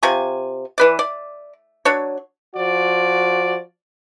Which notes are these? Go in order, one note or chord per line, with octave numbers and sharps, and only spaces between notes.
C3 F4 G#5 C#6
E3 B4 D5
D5
F#3 D4 C#5
F3 F#4 D5